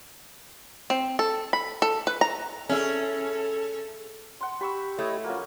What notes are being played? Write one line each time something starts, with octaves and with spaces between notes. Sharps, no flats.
C4
A4
B5
A4
B4
A#5
C#4 E4 G#4 A4 E5
F#5 C6
G4 B5 C#6 E6
A3 E4 C#5 D#5
F3 A#3 C#4 F#4